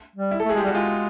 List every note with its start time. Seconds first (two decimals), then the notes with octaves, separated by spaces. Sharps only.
0.16 G3
0.31 E4
0.40 A4
0.45 A3
0.49 G#4
0.54 G#3 G4
0.63 G3 F#4
0.72 G#3 F4